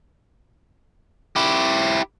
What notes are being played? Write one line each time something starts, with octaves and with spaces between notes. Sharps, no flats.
E4 G4